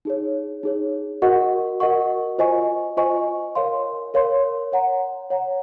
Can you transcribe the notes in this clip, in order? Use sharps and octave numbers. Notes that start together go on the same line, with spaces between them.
D#4 G#4 C#5
D#4 G#4 C#5
F#4 A#4 D#5 F#5 C#6
F#4 A#4 D#5 F#5 C#6
F4 C5 D#5 G#5 C#6
F4 C5 D#5 G#5 C#6
A#4 C#5 F5 C6
A#4 C#5 F5 C6
C#5 F#5 A#5
C#5 F#5 A#5